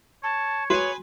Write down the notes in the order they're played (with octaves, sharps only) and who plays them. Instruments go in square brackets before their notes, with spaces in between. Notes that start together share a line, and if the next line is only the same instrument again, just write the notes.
[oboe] C#5 [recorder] A5
[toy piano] F#4 [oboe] G#4 [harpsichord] B4 G#5 [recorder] C#5